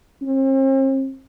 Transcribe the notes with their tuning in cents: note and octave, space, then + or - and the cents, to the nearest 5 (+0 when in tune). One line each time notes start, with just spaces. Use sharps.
C4 +45